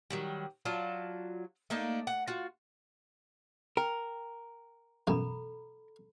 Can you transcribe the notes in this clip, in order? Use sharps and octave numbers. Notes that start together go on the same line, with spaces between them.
D#3 F#3 G3
F#3 F4 D5 A5
A3 A#3 D4 D#4
F#5
F4 F#4
A#4 G5
F#2 B2 E3 A4 A#5 B5